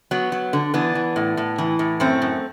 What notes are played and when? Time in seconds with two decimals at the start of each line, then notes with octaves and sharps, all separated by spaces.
0.11 F#3 B3
0.32 F#3
0.53 D3
0.74 E3 B3 D4
0.95 E3
1.16 A2
1.37 A2
1.58 E3
1.79 A2
2.00 F#2 A3 C4
2.22 F#2